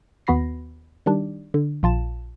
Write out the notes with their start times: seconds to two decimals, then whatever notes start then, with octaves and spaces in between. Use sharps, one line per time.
0.27 D#2 B3 F#4 B5 A#6 C7
1.06 D#3 G3 D4
1.54 D3
1.83 A#1 F4 A5 E7